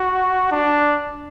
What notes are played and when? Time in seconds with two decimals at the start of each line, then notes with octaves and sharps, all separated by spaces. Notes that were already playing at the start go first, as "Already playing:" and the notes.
Already playing: F#4
0.52 D4